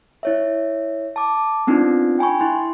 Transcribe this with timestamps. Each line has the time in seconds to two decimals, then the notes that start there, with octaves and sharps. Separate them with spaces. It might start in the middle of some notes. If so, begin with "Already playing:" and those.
0.23 E4 C#5 E5
1.16 A5 D6
1.67 B3 C4 D4 D#4 F4
2.19 G5 G#5 B5 C#6
2.40 E4 C6